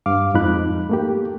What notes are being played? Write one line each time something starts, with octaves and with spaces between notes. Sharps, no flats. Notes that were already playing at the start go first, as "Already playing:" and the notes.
G2 F5 D6
F2 G#2 F3 D#4 B5 F#6
A3 A#3 G4